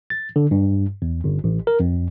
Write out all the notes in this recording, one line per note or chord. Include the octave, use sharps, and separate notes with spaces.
A6
D3
G2
E2
G1
A1
A#4
F2